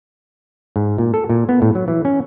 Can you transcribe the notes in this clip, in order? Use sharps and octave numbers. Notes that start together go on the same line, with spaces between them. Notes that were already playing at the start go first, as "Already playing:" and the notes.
G#2
A#2
A4
A#2
B3
A2
F#3
E3
C#4